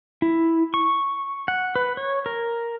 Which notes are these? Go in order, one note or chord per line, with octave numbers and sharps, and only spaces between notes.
E4
C#6
F#5
B4
C#5
A#4